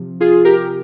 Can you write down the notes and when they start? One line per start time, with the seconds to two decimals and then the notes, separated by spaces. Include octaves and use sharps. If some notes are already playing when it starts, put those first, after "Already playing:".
Already playing: C3 F3
0.20 F4 G#4
0.45 G4 A#4